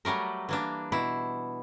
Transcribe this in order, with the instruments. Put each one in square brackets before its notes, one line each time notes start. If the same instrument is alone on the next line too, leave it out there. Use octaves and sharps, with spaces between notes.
[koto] F#3 G3 A3 A#4
E3 A#3 D4
B2 E4